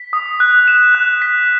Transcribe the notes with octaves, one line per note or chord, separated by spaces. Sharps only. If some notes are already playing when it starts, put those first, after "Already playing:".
Already playing: B6
D#6
F#6
E7
F#6
B6